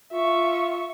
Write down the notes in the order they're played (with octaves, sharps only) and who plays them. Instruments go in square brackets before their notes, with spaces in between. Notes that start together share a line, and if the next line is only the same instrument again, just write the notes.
[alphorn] F4 [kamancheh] E5 C#6